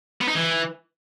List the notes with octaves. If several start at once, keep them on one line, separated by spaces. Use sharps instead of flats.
B3
D#4
E3